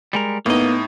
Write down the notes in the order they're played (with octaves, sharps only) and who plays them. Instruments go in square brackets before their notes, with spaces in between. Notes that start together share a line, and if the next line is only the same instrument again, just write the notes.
[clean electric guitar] G3 G#3 A#4
[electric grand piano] A2 D#4 [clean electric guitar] A#3 D#5 [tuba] B3